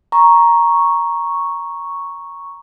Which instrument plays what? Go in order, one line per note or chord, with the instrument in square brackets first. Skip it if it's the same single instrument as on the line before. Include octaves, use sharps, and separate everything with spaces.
[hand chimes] A#5 [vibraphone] C#6